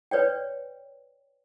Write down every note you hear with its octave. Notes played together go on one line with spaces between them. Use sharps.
B4 C#5 D5 G5